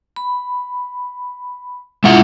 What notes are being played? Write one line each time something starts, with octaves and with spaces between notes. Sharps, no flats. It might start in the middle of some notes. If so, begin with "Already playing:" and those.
B5
G#3 E4 F4 E5 F#5